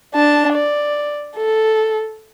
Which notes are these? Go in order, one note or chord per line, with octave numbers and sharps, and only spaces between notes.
D4 A5
D5
A4